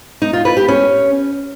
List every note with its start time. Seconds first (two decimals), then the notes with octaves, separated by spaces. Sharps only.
0.22 D#4
0.33 F4
0.45 B4
0.57 G4
0.68 C#4